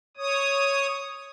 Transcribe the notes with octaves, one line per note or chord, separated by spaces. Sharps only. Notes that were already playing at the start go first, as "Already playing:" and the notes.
C#5 D#6